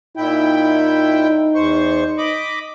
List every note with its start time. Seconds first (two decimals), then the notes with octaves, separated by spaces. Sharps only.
0.17 A#2 D#4 E4 G5
1.55 E2 C5 C#6
2.18 D#5 B5 D6